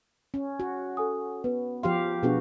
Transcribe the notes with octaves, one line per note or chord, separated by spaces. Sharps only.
C#4
F#4
A4 G#5 D#6
B3 B4
F3 G4 F5 C6
B2 B3 D4 F#4 G#4